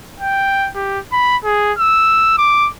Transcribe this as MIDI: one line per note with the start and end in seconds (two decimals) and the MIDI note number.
0.20 0.69 79
0.75 0.99 67
1.13 1.37 83
1.44 1.73 68
1.79 2.34 88
2.38 2.70 86